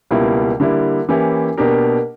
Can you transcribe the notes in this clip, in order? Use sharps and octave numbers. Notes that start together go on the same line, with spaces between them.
C#2 B2 G3 A#3 E4
D3 G3 A#3 E4
E3 A#3 C#4 E4 G4
B2 A#3 D4 G4 A#4